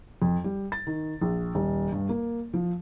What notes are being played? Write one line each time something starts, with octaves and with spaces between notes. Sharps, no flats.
F2
G3
A6
D#3
A#1
D#1
G2
A#3
F3